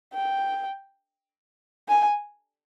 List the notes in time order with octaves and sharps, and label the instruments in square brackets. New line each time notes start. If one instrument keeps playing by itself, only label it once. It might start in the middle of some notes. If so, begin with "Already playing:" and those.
[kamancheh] G5
G#5